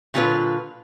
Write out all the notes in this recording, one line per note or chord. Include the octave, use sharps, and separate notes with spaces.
A#2 D3 F#3 A#3 F4 B4